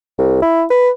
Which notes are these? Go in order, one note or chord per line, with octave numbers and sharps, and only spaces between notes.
C2
E4
B4